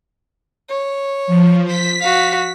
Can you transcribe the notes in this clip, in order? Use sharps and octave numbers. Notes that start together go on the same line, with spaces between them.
C#5
F3
C5 B6
F#4 F5